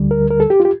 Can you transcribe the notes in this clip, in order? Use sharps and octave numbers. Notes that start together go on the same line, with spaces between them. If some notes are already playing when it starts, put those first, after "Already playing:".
Already playing: D2 D3 G3
A#4
A#4
A4
G4
F4
G4